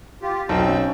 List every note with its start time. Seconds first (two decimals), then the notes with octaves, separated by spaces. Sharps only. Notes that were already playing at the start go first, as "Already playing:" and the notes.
0.22 F4 G4
0.49 B1 F#3 C4 E6 G6
0.67 C#4